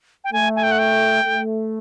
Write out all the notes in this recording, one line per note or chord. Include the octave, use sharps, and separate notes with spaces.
G5
A3 G#5
G#5
G5
F#5
G5
A3